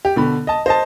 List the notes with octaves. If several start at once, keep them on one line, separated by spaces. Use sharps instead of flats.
G4
B2 D3 B5
D#5 A5
C5 D#5 A5